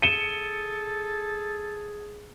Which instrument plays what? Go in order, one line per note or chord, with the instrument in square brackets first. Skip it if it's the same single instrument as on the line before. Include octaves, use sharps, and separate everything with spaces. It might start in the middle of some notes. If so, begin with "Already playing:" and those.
[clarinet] G#4 [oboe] A4 [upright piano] C#7 G7 [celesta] D#7 E7